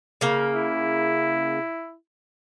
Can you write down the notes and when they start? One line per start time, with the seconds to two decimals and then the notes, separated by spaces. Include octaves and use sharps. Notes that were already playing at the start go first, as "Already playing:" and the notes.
0.21 C#3 A#3
0.54 E4